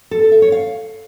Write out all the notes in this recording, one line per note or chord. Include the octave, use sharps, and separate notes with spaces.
A4
A4
E5
C#5
F5